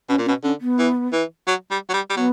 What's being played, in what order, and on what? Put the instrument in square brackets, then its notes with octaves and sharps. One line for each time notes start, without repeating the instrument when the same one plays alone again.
[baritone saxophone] B2 [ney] C#4
[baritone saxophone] A#2
[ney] C#4
[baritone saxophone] B2
[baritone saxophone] D3 [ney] C#4
[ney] B3
[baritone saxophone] E3
E3
F#3
G3
F#3
G3
G3
[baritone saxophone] F#3 [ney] B3